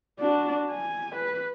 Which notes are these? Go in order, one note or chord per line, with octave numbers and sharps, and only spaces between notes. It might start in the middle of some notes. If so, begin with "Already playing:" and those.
D4 F#4
G#5
B4